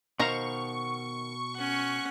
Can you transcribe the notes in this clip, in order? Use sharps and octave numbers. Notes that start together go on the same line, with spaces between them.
B2 D#3 C5 F5 A#5 C#6
C#4 F#5